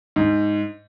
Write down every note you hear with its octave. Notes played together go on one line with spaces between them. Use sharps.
G#2